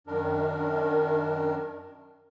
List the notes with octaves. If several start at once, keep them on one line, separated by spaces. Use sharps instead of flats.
F#2 D#3 D4 A#4